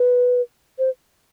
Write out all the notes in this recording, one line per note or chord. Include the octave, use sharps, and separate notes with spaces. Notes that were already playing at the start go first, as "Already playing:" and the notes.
Already playing: B4
C5